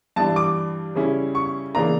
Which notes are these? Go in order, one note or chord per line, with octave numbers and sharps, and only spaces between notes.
G2 E3 G3 D4 A5
D6
C#3 G3 C#4 E4
C#6
C#3 E3 A#3 D4 A#5